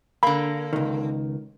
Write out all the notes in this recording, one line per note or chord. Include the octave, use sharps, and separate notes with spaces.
D3 A#3 B5
C#2 D#3